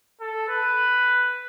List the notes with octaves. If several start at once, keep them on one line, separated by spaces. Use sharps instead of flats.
A4
B4